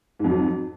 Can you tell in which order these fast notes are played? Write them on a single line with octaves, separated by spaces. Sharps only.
G#2 F2 F#3